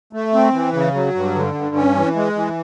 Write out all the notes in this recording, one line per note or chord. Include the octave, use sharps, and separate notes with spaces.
A3
C4
E3
C#3
F#3
G2
D3
G2
C#4
E3
G#3
E3